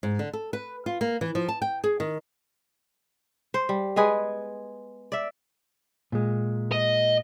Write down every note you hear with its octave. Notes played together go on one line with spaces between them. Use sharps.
G#2
D3
A4
B4
F4
A#3
E3
F3
A5
G5
G#4
D#3
C5
G3
G#3 B3 G#4 B4
D5 E5
A#2 G#3
D#5